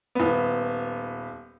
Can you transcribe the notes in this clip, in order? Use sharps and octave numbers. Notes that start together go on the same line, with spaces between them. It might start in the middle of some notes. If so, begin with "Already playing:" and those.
D#1 B3